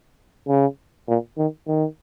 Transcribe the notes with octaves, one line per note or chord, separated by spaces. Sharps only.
C#3
A#2
D#3
D#3